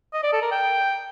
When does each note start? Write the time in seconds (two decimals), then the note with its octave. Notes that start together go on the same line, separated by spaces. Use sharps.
0.14 D#5
0.23 D5
0.33 A4
0.42 A#4
0.51 G5